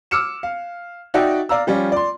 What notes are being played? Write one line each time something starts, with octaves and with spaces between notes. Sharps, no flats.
D6 E6 F6 C#7 E7
F5
D#4 F#4 D5 E5 F#5 G5
D5 F5 A#5 E6
F3 G3 C#4 F4
D5 C6